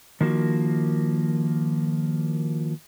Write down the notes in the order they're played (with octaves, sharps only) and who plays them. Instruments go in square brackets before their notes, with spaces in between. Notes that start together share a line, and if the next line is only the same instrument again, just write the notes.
[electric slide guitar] D#3 F3 A#3 F#4